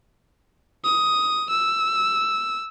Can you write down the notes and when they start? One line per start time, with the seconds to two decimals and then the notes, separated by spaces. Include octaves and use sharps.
0.84 D#6
1.50 E6